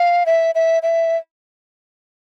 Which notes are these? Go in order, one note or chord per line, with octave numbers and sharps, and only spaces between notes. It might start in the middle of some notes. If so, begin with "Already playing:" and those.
Already playing: F5
E5
E5
E5